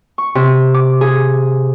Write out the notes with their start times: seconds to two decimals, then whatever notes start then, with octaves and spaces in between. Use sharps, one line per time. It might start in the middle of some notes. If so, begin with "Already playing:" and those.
0.18 C#6
0.35 C3
0.74 D6
1.01 G#4